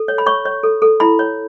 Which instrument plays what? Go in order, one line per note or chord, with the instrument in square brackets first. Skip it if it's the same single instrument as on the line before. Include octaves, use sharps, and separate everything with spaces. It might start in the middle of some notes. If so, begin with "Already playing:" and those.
Already playing: [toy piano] A4
C#5
B5
C#5 C#6
C#5
A4
A4
E4 B5
C#5